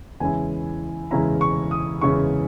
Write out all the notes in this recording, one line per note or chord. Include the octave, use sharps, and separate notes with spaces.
E2 C#3 G#3 C#4 E4 G#5
E2 C#3 G#3 C#4 E4 A#5
C#6
D#6
E2 C#3 G#3 C#4 E4 C#6